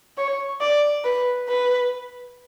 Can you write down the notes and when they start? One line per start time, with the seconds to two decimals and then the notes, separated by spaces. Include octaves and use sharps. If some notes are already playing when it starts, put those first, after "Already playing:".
0.17 C#5
0.61 D5
1.04 B4
1.48 B4